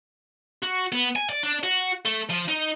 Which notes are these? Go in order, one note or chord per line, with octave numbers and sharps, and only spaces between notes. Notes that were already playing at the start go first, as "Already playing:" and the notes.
F#4
B3
G#5
D5
D4
F#4
A3
F3
D#4